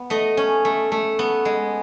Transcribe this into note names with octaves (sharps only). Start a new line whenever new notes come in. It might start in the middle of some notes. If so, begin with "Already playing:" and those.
Already playing: B3
A3 D#5
C#4
A3
A3
B3
G#3